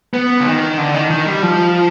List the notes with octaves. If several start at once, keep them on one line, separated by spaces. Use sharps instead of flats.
B3
D3
D#3
D3
D#3
D#3
G3
F3